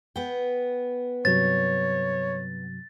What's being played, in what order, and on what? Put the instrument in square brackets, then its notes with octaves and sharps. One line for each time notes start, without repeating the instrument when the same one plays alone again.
[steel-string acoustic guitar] B3 G5
[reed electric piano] G2 C3 F#3 [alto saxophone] C#5 [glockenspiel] A6